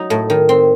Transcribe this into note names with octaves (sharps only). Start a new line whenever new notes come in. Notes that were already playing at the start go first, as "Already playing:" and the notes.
Already playing: F#3 D#4
A2
D#3
C4